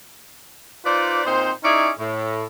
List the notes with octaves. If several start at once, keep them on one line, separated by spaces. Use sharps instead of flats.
D#4 F4 B4 C5 D5
A#2 C4 D#4 C5
C#4 D#4 E4 G#4 C#5 D5
A2